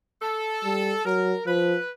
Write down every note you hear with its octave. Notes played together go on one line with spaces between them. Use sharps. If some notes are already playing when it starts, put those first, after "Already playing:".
A4
G3
F#3 A#4
F3 B4